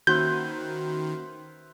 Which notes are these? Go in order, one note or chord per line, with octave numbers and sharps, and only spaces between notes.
D#3 A#3 C#4 F#4 B4 C5 E5 G6